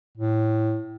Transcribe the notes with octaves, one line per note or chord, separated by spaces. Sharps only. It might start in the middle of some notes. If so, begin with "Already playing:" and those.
A2